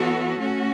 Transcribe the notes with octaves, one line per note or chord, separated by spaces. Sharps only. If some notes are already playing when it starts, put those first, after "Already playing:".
Already playing: E3 B3 F#4 A4 C#5
A3 C#4 F#4